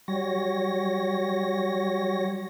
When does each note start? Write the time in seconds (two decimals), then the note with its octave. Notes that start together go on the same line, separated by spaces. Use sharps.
0.08 F#3 G3 C#5 A#6